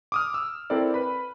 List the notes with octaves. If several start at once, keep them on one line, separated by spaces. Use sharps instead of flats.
D6 D#6 F6
E6
C4 E4 A4 A#4 D5
B4 B5